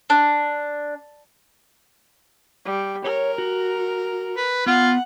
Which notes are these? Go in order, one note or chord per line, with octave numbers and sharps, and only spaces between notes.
D4
G3
A#4 C#5
F#4
B4
B3 F4 F#5